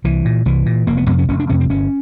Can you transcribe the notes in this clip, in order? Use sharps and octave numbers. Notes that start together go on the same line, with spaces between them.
C2 E3
A#2
C2 E3
A#2
F1 A#3
B3
F2 C3 B3
C#4
F1 C#4
D4
F2 C3 C#4
C4
G1 C#4